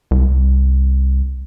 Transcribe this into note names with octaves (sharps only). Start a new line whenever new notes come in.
C2